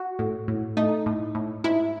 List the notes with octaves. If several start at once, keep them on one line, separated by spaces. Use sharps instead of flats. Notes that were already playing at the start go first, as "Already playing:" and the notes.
Already playing: F#4
A2
A2
A3 D#4
A2
A2
G#2 E4